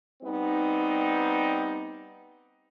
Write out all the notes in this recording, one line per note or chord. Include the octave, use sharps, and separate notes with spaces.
G3 B3 C4 D#4